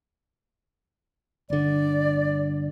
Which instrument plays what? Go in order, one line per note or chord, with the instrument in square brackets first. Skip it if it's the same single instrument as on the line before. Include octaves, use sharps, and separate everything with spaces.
[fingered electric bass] G1 D3 [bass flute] D5